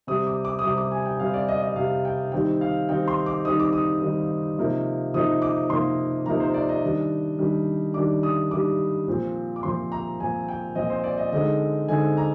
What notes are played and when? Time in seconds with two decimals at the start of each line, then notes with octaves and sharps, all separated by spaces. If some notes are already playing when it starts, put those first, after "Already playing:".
0.07 C3 G3 C4 D#6
0.27 D6
0.45 D6
0.59 D#6
0.64 C3 G3 C4 D6
0.77 D6
0.91 G#5
1.06 G5
1.20 C3 G3 C4 F5
1.34 D5
1.48 D#5
1.62 D#5
1.76 C3 G3 C4 F5
2.05 G5
2.32 D#3 G3 C4 D#4 G5
2.61 F5
2.89 D#3 G3 C4 D#4 G5
3.08 C6
3.26 D6
3.44 D#3 G3 C4 D#4 D#6
3.60 D6
3.73 D#6
4.01 D#3 G3 C4 D#4
4.58 C3 F3 A#3 D#4
5.13 C3 F3 A#3 D#4 D#6
5.42 D6
5.69 C3 F3 A#3 D#4 C6
6.26 C3 F3 A#3 D#4 A#5
6.40 C5
6.54 D5
6.69 D#5
6.83 D#3 G3 D4
7.39 D#3 G3 D4
7.94 D#3 G3 D4 D6
8.23 D#6
8.51 D#3 G3 D4 D6
9.08 A#2 F3 C4
9.56 D6
9.63 A#2 F3 C4 C6
9.92 A#5
10.20 A#2 F3 C4 G#5
10.48 G5
10.75 A#2 F3 C4 D#5
10.90 C5
11.04 D5
11.18 D#5
11.32 D3 G#3 C4 D#4 D#5
11.88 D3 G#3 C4 D#4 G#5
12.17 A#5